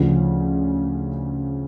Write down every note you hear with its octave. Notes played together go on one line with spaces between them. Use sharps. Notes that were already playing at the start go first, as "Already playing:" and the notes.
Already playing: D2 C#3 F3